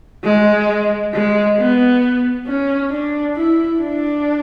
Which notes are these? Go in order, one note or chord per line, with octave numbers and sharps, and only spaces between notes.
G#3
G#3
B3
C#4
D4
E4
D4